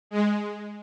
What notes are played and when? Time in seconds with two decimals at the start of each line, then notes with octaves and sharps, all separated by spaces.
0.11 G#3